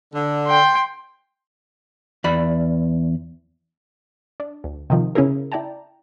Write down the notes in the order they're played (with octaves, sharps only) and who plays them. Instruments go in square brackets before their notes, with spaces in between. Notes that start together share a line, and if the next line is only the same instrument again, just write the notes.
[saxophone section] D3
[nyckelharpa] G5 C6
[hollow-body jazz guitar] E2 D5 B5
[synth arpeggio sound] D4
D2
C3 D#3 F3
C#3 C#4 E4 G#4 A#4
E4 D5 G5 A5 A#5